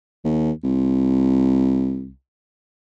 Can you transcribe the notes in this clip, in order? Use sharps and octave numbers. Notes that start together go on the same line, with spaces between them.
D#2
C2